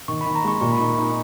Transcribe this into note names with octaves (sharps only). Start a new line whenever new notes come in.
D#3 C#6
B5
D#3
A#5
G#3 C#6
A#2 C#6
B5
D#4 C#6
D#4